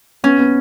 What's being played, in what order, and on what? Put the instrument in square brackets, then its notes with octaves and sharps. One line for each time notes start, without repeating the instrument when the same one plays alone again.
[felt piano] B3 [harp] C#4
[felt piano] B3